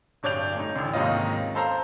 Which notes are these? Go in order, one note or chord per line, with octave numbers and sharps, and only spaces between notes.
D1 G2 C#5 D5 G6 F7
A3 D#4
A1 D2
D#2 G#2 C3 C#4 F4 D#5
A4 C5 F5 A#5